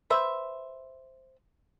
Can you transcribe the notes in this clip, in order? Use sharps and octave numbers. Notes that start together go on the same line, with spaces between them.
B4 C5 E5